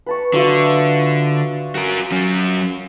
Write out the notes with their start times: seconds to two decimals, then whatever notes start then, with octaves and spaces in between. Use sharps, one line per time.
0.06 B4 A5 C#6
0.33 D3 F#3 F4 E5
1.75 F#4 A#4 D#6
2.12 F#3 C#4